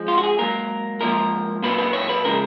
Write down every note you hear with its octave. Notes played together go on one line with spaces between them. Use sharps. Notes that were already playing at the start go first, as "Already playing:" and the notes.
Already playing: F2 F3 G#3
F4
F#4
G#4
G#2 F#3 A#3 A#4
G#2 F3 A#3 A#4
A#2 F#3 A#3 B4
B4
C#5
B4
C#3 F3 G#3 A#4